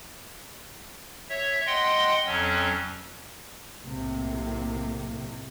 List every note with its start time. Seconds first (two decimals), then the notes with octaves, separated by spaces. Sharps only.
1.29 C#5 E5
1.66 D#5 F#5 G5 C6
2.26 F2 F#3 C#4
3.82 B1 A2 C3 A#3